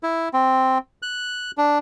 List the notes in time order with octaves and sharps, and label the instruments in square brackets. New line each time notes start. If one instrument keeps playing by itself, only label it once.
[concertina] E4
C4
F#6
D4